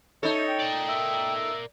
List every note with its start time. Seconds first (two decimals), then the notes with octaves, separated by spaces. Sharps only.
0.23 D#4 A4 C#5 E5
0.47 G5
0.60 A#4 D5
0.89 E5